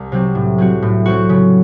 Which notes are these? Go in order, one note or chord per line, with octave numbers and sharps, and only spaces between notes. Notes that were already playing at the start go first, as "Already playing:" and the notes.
Already playing: C2
C3 F#3 C4
A2
F#3 C4 F#4
A2
F#3 C4 F#4
C#3